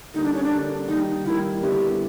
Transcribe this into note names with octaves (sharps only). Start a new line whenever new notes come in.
D3 G3 A#3 D#4
D4
C#4
D4
D3 G3 A#3
D#3 G3 A#3 D#4
D#3 G3 A#3 E4
D3 G3 B3 E4 G4